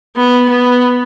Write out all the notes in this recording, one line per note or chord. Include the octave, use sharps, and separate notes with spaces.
B3
B3